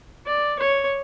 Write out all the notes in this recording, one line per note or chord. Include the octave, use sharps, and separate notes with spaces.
D5
C#5